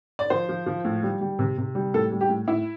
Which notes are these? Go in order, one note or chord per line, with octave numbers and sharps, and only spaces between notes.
D5
F3 C5
F3
F3
A2
G3
G3
C3
C3
G3
A2 A4
G3
G4
A2
A2 E4